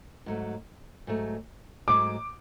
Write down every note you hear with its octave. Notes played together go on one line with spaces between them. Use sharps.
G#2 F#3 A3
G#2 F#3 A3
G#2 F#3 A3 D6